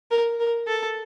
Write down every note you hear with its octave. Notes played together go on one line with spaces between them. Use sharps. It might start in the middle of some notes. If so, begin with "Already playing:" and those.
A#4
A#4
A4